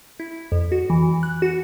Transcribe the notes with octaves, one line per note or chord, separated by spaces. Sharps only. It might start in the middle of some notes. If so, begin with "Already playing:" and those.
E4
F2
F#4
E3
F#6
F#4